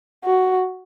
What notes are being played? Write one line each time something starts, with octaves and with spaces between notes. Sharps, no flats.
F#4